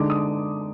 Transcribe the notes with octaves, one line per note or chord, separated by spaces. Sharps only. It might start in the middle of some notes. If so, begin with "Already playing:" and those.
Already playing: D3 G#3 D#4 D6
D#6